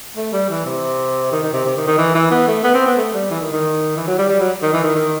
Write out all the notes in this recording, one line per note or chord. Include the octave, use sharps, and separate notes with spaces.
A3
G3
E3
C3
D#3
D#3
C3
C3
D#3
D#3
E3
E3
B3
A3
B3
C4
B3
A3
G3
E3
D#3
D#3
E3
F#3
G3
G3
F#3
D#3
E3
D#3
D#3